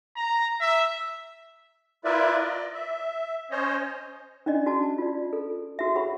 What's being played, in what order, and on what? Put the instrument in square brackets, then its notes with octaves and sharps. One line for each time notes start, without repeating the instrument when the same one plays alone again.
[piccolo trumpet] A#5
E5
[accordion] E4 F4 A#4 B4 D5 E5
D5 D#5
E5
C#4 C5 C#5 D#5
[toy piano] C#4 D4 D5 D#5
F#4 A5
F4 D5
A4
F#4 E5
G4 C#5 F#5 B5